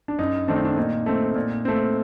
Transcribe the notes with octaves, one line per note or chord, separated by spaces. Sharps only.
D4
F#2 D#4
D#3 A3 C4 D4
D#4
D4
A#2 D#4
A3 C4
A#2
A3 C4